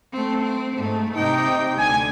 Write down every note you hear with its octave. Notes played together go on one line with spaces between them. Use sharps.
A3 C4
C4
G#2 A3
C3 D#4 G5
D2 G#5